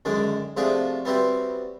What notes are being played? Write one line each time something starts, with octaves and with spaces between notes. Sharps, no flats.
F#2 D3 D#3 G#3 D4
C3 F3 A3 D4 F#4 G#4
G3 B3 C4 E4 F#4 G4